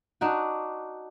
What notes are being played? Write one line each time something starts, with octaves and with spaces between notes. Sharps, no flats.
D4 D#4 F#4